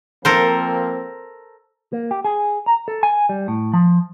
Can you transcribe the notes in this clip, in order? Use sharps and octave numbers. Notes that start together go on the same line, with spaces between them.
F3 A#3 C4 A4 A#4 C5
A#3
G4
G#4
A#5
A4
G#5
G3
A2
F3